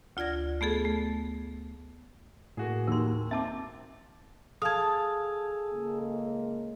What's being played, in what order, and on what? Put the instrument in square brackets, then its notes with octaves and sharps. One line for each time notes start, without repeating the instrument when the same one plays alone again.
[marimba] D2 F4 D5 G#6 A#6
A3 B3 G#4 A4
A3
[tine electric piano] A2 [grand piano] A#3 F#4 G#4
[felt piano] D#2 [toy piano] A#4 C6
[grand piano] C4 [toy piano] E5 A5 D6 [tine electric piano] A6
[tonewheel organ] G#4 A4 [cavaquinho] F5 A5 [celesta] D#6 G#6
[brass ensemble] C#2 G#3 A#3